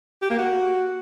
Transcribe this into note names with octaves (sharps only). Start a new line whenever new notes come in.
G4
A#3
F#4